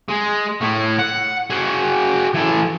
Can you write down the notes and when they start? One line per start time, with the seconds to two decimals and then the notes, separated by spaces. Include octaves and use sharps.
0.08 G#3
0.61 A2 A3
0.98 F#5
1.50 F#4 G#4
2.34 E3 A4